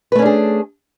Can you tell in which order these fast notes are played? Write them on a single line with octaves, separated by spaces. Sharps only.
B4 A3 C#4 D4 G#4